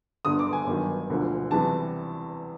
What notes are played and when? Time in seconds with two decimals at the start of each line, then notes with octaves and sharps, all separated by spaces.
0.25 G1 G2 D3 D#6
0.39 D6
0.53 G#5
0.67 G1 G2 D#3 F#3
1.09 E1 D2 D3 F3
1.51 E2 C3 E3 G3 A5